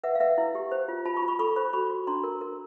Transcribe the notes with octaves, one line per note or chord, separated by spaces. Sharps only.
B4 E5 F#5
F5
B4 E5 F#5
E4
G4
C5
F4
F4 A5 B5
B5 C#6
F4
B5 C#6
A4 B5 C#6
C5 B5 C#6
F#4 B5 C#6
F#4
D4 A#5 C6
A#4
A#4